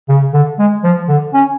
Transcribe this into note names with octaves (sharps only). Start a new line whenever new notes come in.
C#3
D3
G#3
F3
D3
C#4